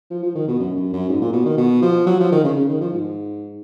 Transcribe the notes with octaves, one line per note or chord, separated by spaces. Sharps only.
F3
F3
D#3
B2
F#2
F#2
F#2
G#2
A#2
B2
D#3
B2
F3
F#3
F3
D#3
C#3
C#3
D#3
F3
G#2